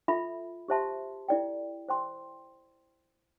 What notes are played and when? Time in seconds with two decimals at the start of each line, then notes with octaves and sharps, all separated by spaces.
0.08 F4 A4 E5 B5
0.68 G4 C5 E5 A5 C6
1.28 E4 A4 D5 G5
1.89 C5 G5 C6